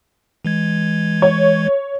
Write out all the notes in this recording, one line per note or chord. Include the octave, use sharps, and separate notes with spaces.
E3 G#3 G#6
C#5